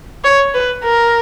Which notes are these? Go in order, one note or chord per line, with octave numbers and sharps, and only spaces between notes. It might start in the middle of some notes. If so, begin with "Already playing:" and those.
C#5
B4
A#4